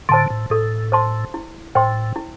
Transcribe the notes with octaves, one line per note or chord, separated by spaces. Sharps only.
A2 D3 C5 A5 C6
A2
A2 A4
C5 A5 C6
E4
A2 C5 G5 C6
E4